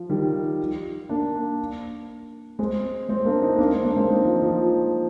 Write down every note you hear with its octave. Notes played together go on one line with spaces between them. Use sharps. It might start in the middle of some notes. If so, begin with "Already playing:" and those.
Already playing: F3
D#3 G3
A#3 D4
G#3 C4
G#3 C4
A#3 D4
C4 D#4
A#3 D4
G#3 C4
A#3 D4
G#3 C4
C4 D#4
F3
F3